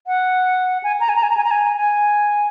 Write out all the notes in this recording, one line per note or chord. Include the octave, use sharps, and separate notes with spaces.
F#5
G#5
A#5
G#5
A#5
G#5
A#5
G#5
A#5
G#5
G#5